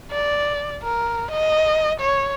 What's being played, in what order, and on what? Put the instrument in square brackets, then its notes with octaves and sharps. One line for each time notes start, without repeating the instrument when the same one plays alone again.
[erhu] D5
A#4
D#5
C#5